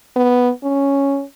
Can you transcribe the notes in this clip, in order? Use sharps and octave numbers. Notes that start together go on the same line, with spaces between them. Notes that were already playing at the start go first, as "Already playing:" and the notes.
B3
C#4